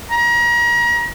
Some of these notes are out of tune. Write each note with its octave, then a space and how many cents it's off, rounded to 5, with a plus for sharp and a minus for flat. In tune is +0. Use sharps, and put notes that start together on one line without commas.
A#5 +35